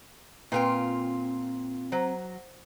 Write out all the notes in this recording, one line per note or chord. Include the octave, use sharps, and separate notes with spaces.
A#2 C4 F4 B4 G5
F#3 C5 A#5